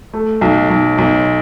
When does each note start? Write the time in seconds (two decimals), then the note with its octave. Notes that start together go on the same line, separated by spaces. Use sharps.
0.13 A3
0.41 B1
0.70 B1
0.98 B1